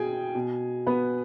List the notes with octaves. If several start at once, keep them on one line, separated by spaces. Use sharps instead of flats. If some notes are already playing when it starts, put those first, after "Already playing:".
Already playing: B2 G#4 G5 G#5
B2
B3 B4